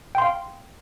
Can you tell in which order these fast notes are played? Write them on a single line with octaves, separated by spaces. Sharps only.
G5 C6 F5